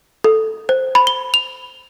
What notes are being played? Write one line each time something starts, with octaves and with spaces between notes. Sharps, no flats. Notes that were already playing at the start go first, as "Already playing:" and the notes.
A4
C5
B5
G7
F7